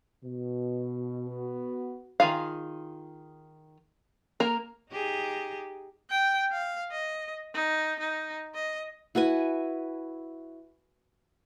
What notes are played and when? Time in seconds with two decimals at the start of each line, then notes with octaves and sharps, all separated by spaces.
0.24 B2
1.27 B3 F#4
2.20 D#3 F4 G#4 F5
4.40 A#3 A#4
4.91 D#4 G4 G#4
6.10 G5
6.52 F5
6.91 D#5
7.54 D#4
8.00 D#4
8.54 D#5
9.15 E4 F#4 B4 G#5